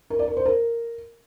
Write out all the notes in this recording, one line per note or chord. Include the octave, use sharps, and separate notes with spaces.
A#4
D5
A#4
C5
A#4